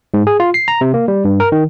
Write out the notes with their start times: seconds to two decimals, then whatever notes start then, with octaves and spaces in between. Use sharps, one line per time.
0.14 G#2
0.27 G#4
0.40 F4
0.54 C7
0.68 A#5
0.81 C3
0.94 A#3
1.08 G3
1.25 G2
1.40 A#4
1.52 D#3